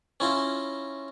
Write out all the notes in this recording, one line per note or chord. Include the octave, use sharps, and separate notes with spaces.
C#4 E4 F4 A#5